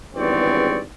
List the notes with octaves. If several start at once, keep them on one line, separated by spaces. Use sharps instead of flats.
G#1 E2 G2 C4 C#5 D5